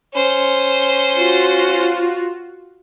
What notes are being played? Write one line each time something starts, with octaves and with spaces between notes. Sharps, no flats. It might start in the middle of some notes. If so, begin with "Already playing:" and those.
C#4 C5
F4 F#4